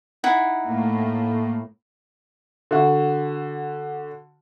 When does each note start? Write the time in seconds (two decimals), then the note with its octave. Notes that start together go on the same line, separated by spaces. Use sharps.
0.24 D#4 E4 F#5
0.64 A2 A#3
2.71 D3 F#4